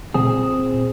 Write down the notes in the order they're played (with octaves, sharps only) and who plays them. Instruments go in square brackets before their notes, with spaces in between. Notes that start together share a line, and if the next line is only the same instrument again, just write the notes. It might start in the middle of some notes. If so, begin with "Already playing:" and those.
[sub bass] A#2 [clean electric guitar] C4 G#4